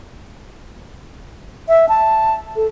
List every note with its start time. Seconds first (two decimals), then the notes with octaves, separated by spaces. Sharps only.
1.68 E5
1.89 A5
2.56 A4